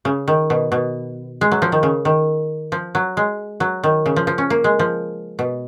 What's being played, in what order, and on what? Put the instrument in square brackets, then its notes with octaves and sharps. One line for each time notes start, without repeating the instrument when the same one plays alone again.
[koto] C#3
D#3
B2
B2
G#3
F#3
F3
D#3
C#3
D#3
F3
F#3
G#3
F#3
D#3
C#3
F3
F3
C#4
A#3
G#3
F3
B2